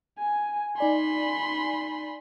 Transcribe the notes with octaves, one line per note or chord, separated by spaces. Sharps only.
G#5
D#4 D5 G#5 B5 C6